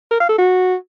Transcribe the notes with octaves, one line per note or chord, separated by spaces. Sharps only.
A#4
F5
A4
F#4